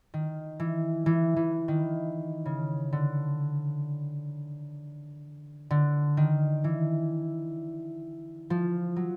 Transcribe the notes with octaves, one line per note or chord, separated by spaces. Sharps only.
D#3
E3
E3
E3
D#3
C#3
D3
D3
D#3
E3
F3
F#3